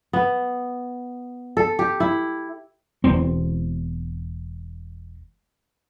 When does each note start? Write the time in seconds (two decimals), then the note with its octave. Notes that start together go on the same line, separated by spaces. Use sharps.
0.13 B3
1.57 A4
1.79 G4
2.00 E4
3.04 E1 E2 C4